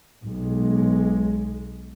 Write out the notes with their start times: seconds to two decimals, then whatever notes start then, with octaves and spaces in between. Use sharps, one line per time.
0.22 B1 G#3